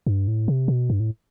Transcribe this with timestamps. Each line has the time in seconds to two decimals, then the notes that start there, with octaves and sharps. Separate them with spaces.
0.07 G2
0.28 A2
0.48 C3
0.68 B2
0.90 G2
1.00 A2